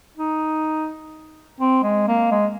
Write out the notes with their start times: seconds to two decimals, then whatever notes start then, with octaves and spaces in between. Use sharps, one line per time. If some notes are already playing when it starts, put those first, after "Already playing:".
0.17 D#4
1.60 C4
1.83 G#3
2.07 A#3
2.31 G#3